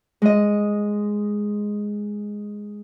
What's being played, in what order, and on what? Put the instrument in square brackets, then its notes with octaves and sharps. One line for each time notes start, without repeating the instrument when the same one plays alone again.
[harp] G#3 D#5